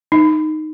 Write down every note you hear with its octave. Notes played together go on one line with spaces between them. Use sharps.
D#4